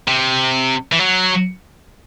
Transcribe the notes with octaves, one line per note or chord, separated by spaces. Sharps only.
C3
E3
F#3